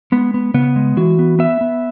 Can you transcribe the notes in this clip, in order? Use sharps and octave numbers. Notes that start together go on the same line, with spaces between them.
G#3 B3
B3
C#3 B3
G#3
E3 F#4
B3
B3 E5
B3